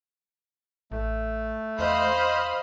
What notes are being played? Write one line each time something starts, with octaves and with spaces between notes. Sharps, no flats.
A1 A3
E2 C5 D#5 F5 B5